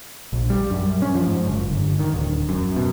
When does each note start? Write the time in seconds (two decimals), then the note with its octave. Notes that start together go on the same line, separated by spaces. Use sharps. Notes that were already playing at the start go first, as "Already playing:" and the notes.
0.33 A#1
0.50 G3
0.71 F#2
1.02 C#4
1.15 F3
1.27 G#2
1.48 F#1
1.72 G1
1.99 D#3
2.14 D1
2.49 F#2
2.76 B2